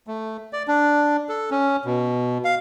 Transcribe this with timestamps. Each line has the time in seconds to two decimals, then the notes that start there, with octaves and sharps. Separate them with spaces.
0.07 A3
0.53 D5
0.68 D4
1.29 A4
1.51 C#4
1.85 B2
2.44 F5